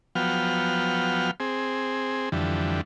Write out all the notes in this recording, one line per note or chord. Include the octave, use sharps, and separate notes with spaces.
F3 F#3 B3 G5 F6
C4 G#4
F2 D3 E3 G3